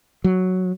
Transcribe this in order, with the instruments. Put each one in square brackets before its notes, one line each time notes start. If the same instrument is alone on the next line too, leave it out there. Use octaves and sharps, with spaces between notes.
[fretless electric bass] F#3